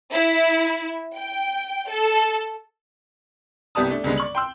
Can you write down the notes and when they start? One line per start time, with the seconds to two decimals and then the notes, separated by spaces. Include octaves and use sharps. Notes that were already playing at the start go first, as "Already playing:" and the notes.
0.12 E4
1.17 G5
1.88 A4
3.75 C2 B3 G4 D5 A5 D#6
3.90 A3 D4
4.04 C#2 D3 G3 G#3 B3
4.17 D5 C#6 F#7
4.35 G5 C6 E6